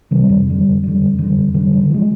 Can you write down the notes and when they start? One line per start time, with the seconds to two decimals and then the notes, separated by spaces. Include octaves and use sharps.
0.11 C3 D#3 G3
0.29 F2
0.48 D3 G3
0.64 F2
0.83 D3 G3
1.01 F2
1.18 D3 G3
1.36 F2
1.54 D3 G3
1.73 D3
1.90 F3 G#3